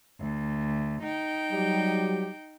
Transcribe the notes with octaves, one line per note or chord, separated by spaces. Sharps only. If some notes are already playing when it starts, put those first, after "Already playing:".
D2
D#4 G5
F#3 G3 G4